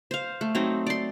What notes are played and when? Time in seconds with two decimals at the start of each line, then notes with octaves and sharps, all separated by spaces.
0.11 C5 F5
0.41 A3
0.55 F#3 C4 D#4
0.87 D5 C6